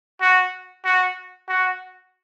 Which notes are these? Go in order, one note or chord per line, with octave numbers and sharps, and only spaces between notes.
F#4
F#4
F#4